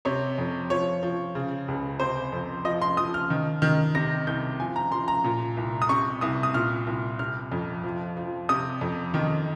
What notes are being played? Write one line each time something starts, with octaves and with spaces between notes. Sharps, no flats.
C3 C#5
F2
F3 C#5
F3
C#3
C#2
C3 C5
F2
F3 D#5
C6
F3 D#6
F6
D#3
D#3
C3 A#6
C2 G6
F3 G#5
A#5
F3 C6
A#5
A#2
C2
D#6
C3 C#6
C2 D#6
D#6
A#2 F6
C2
C3 F6
F2
F3
F3
C3 D#6
F2
D#3